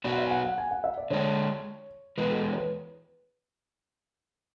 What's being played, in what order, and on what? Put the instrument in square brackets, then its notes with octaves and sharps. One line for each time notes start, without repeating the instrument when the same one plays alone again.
[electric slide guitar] F#3 B3 F#4 B4 [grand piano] D5
[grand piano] F#5
E5
G#5
F#5
F#5
G#5
F#5
E5
D5
[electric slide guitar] D3 G#3 D4 [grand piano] C#5
[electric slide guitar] E3 G#3 B3 [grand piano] B4
[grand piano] A4
G#4
C#5
B4